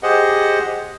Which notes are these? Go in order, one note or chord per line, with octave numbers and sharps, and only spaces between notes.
G4 G#4 C5 D#5 F#5